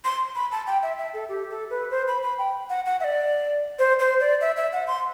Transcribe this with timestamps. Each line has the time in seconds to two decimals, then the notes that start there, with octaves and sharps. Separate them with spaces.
0.05 C6
0.35 B5
0.52 A5
0.67 G5
0.83 E5
0.98 E5
1.14 A4
1.29 G4
1.50 A4
1.70 B4
1.91 C5
2.08 B5
2.23 B5
2.38 G5
2.70 F#5
2.86 F#5
3.00 E5
3.04 D5
3.79 C5
3.99 C5
4.20 D5
4.41 E5
4.57 E5
4.73 F#5
4.87 C6